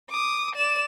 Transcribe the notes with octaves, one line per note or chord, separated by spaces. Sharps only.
D6 D#6
D5 E7